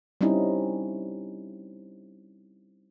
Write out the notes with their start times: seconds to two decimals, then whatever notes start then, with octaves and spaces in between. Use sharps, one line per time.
0.21 G3 C4 C#4 D#4 E4